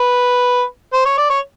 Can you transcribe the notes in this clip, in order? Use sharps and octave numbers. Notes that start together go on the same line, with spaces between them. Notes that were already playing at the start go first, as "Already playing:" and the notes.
Already playing: B4
C5
C#5
D5
C#5